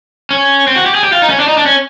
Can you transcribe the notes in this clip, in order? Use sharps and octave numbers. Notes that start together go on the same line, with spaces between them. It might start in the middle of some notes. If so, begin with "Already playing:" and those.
C#4
C4
F#4
G4
G#4
G4
F4
D#4
C#4
D4
D#4
D4
C#4